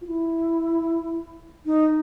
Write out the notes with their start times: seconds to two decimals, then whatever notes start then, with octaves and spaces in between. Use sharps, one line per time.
0.01 F4
0.07 E4
1.66 D#4